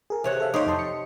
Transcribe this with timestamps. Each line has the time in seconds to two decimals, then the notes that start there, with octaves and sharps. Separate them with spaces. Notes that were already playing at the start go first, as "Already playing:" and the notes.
0.10 G#4 A#4
0.24 C3 C#5 F#5
0.40 A4 E5 F5
0.54 D#4 G4 C#5 C6 D6
0.67 F2 A5 C6
0.79 C#7